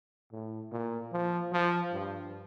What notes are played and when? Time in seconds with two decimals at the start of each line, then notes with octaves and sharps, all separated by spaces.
0.32 A2
0.72 A#2
1.12 F3
1.53 F3
1.93 G2